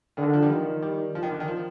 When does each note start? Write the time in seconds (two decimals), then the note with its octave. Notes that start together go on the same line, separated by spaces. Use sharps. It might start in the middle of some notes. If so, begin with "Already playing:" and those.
0.17 D3 D#3
0.33 F3
0.42 G3
0.50 D#3 F3
0.82 G3
1.15 F3
1.23 D#3
1.31 D3
1.40 D#3
1.48 F3